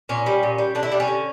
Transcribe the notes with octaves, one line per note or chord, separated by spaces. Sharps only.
A#2 C#4
G3
A#2
G3
D3 D4
E4
G3 D4
C#4
D3